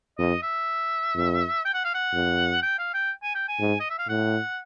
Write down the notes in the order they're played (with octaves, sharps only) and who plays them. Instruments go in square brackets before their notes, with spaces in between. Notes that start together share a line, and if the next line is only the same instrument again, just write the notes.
[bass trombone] F2 [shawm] D#5
[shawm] E5
[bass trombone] F2
[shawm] G5
F#5
F5
F#5
[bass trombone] F2
[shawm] G5
F5
G5
G#5
G5
G#5
[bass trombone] G#2
[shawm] D#5
E5
F5
[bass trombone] A2 [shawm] F#5